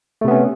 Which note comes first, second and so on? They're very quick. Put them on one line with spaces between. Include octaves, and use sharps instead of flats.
A3 C3 B3 C#4